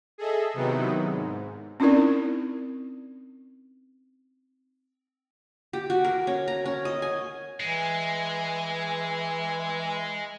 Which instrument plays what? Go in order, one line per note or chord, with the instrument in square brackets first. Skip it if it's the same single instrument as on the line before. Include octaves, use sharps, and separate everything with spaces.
[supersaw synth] G#4 A4 D#5 E5
C3 D#3 F#3 B3 D#4 E4
G#2
[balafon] C4 C#4 D#4 E4 A#4 D5
[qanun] G4
F#4
A#4
C#4
A#5
C#4
D#5
G#5
[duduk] E3 [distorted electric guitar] G#3